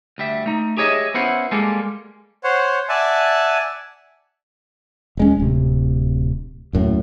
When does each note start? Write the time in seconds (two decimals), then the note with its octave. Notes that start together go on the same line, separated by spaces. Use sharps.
0.18 D2 G3 E5
0.46 A3 D#4
0.77 G4 G#4 C#5 D#5 E5
1.14 B3 C#4 E4 C5 F#5
1.51 G3 G#3 A#3 A4
2.44 C5 C#5 F#5
2.89 D5 E5 F#5 G#5 A5
5.17 D#1 G#3 C#4
5.40 D1 C3
6.73 D#1 F#2 A2